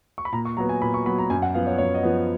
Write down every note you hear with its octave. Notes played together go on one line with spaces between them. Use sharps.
C#6
B5
A#2 A#5
C#6
F#3 B3 A#5
G#5
A#2 B5
C#6
F#3 B3 B5
A#5
F#2 G#5
F#5
F3 B3 F5
C#5
F#2 C#5
D#5
F3 B3